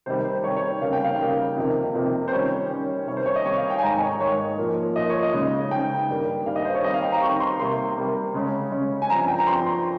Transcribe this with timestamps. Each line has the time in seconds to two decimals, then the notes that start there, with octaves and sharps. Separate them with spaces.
0.06 C3 D#3 G3 C5
0.25 C5
0.44 C3 D#3 G3 C#5
0.57 C#5
0.81 C#3 G3 A#3 D#4 F5
0.93 G5
1.04 F5
1.19 C#3 G3 A#3 D#4
1.57 F2 C3 D#3 A#3
1.95 F2 C3 D#3 A#3
2.28 C5
2.32 D#3 G3 C#4 C#5
2.70 D#3 G3 C#4
3.07 C3 D#3 G3 C#5
3.17 C5
3.26 C#5
3.36 D#5
3.45 C3 D#3 G3 C#5
3.58 F5
3.70 G5
3.78 G#5
3.83 G#2 D#3 G#3 A#5
3.92 G#5
4.02 C#5
4.20 G#2 D#3 G#3 C#5
4.58 A#2 F3 A#3
4.96 A#2 F3 A#3 D#5
5.09 C#5
5.23 D#5
5.34 C#3 G#3 D#4
5.71 C#3 G#3 D#4 G5
6.09 G2 D#3 G3 A#3
6.46 G2 D#3 G3 A#3 F5
6.56 D#5
6.65 C5
6.74 C#5
6.83 D#3 G3 C4 D#4 D#5
6.94 F5
7.02 G5
7.12 A#5
7.21 D#3 G3 C4 D#4 C#6
7.40 C6
7.59 C3 G3 A#3 C6
7.97 C3 G3 A#3
8.34 C#3 G#3 C#4
8.72 C#3 G#3 C#4
9.02 G#5
9.10 G2 F3 C4 A#5
9.19 G#5
9.28 G5
9.38 A#5
9.47 G2 F3 C4 C6
9.66 C6